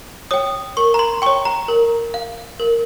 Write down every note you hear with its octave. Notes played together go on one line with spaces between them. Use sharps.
C#5 G5 D#6
A#4 C#6
A#5
C6
C#5 G5 C#6
A#5
A#4
F5
A#4